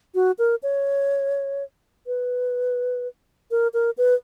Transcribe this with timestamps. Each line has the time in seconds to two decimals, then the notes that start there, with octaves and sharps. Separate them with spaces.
0.15 F#4
0.39 A#4
0.63 C#5
2.07 B4
3.51 A#4
3.74 A#4
3.98 B4